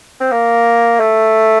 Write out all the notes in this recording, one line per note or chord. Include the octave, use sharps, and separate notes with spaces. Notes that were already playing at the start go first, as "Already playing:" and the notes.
C4
A#3
A3